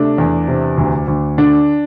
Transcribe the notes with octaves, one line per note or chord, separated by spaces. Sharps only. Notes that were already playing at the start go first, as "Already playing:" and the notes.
Already playing: C3 A3 D4
E2
C3
D2
D2
D3 D4